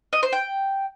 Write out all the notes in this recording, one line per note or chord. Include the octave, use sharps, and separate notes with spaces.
D#5
C5
G5